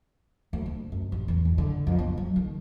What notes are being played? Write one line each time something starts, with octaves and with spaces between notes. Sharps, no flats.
D2
D4
F#2
A1
E2
G#1
D3
F2
B3
F#3
D#3